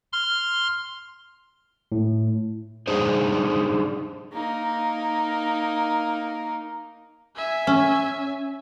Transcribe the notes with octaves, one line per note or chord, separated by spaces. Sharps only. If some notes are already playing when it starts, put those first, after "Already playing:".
C6 F6
A2
D4 D#4 G#4 C5
A#3 D#4
E5 G#5
C#4